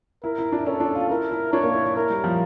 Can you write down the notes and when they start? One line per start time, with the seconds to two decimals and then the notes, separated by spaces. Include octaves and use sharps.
0.23 E4 A#4
0.38 E4
0.52 D4
0.66 C#4 A4
0.80 D4
0.95 F4
1.10 E4 A#4
1.31 E4
1.53 D4 C#5
1.63 A#3
1.74 E4
1.85 E4
1.96 E4 A#4
2.10 G3
2.24 F3